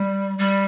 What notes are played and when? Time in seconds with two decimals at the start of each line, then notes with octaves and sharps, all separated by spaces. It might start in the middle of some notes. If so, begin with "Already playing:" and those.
Already playing: G3
0.39 G3